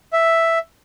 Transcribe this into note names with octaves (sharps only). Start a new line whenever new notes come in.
E5